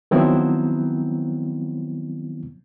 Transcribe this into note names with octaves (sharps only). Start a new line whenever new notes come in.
D#3 F3 F#3 B3 C4 E4